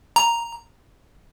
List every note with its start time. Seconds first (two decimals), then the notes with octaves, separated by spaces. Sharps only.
0.16 A#5